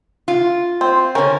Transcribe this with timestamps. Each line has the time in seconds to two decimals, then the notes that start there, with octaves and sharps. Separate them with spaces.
0.28 F4
0.81 C4
1.15 D3 C#4 A#4